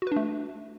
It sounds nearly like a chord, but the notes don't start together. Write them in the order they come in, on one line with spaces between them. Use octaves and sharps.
F#4 B4 D4 A3